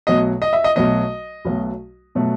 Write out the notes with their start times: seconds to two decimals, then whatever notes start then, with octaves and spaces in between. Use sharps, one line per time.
0.07 B1 B2 F#3 A3 D#5
0.42 D#5
0.53 E5
0.64 D#5
0.76 B1 B2 F#3 A3 D#5
1.45 B1 B2 F#3 A3
2.15 B2 F#3 A3